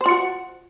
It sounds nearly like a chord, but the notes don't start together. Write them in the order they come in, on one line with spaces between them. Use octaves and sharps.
C5 F4 F#4